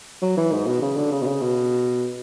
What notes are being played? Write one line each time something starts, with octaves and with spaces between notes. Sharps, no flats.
F#3
E3
G#2
B2
C#3
D3
C#3
B2
C#3
B2